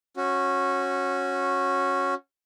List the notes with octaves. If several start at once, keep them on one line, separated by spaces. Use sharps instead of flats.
C#4 F#4